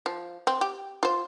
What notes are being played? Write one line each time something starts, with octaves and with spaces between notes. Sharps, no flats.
F3
C4
G4
F4 C5